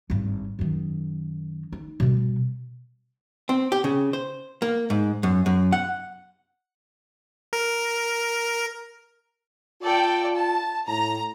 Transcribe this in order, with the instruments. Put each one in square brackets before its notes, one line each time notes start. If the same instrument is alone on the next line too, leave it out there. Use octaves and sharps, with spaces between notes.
[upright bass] G#1 G2
F#2 D#3
D#4
B2 G3
[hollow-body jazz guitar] C4
G4
C#3
C5
A#3
G#2
F#2
F#2
F#5
[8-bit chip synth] A#4
[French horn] F4 [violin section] A4 D5 G5
[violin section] A5
[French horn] A2 [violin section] A#5